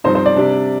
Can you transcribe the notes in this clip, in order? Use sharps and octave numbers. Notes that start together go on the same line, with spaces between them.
G2 F3 C4 D#4 C5
C5
D5
C3 G3 D4